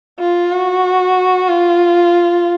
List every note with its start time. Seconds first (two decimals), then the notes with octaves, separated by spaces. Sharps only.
0.19 F4
0.52 F#4
1.48 F4